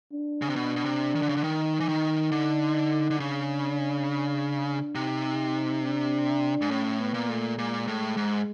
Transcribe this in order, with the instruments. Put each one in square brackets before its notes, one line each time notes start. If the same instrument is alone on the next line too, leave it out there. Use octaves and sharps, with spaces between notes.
[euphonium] D4
[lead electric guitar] C#3
C3
B2
B2
C3
D#3
D3
C#3
D3
[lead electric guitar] D#3 [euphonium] D#4
[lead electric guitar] E3
D#3
D3
D3
[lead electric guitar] C#3 [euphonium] D4
[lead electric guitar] C3 [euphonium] D#4
[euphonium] D4
[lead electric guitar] G#2
[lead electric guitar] A2 [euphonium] C#4
[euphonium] B3
[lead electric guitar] A#2
[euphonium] A3
[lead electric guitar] A#2 [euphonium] G#3
[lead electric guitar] A2
G#2